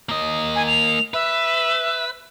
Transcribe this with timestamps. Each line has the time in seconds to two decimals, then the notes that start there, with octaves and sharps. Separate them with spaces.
0.09 A#3 D#5
0.56 G#5
0.67 F7
1.14 B4 E5